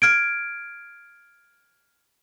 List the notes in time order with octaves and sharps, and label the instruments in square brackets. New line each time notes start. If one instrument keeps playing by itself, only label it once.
[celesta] F6 G#6 D7